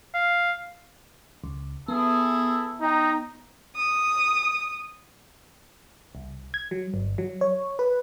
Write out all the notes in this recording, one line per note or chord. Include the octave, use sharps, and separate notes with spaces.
F5
C#2
B3 E4 G#4 A4
D#4 G5 A#5
D#6
C2
G#6
F#3
G1
F#3
C#5
B4